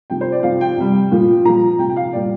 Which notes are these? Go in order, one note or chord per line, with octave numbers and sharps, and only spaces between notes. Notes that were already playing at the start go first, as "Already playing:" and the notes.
C3 F3 G5
C5
D5
C3 F3 F5
G5
C3 G3
A#2 F3
A#2 F3 A#5
C3 F3 G5
G5
F5
A#2 G3 D5